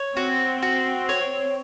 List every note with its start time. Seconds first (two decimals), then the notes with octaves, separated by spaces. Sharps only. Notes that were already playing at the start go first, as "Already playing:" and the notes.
Already playing: C#5
0.16 C4 F#4
0.62 F#4
1.09 C#5